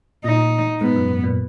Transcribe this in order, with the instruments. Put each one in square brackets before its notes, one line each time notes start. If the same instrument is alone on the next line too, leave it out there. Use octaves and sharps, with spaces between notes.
[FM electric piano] A#2 [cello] D#4
[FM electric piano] G#2 [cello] B3
[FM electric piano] F#2
A#2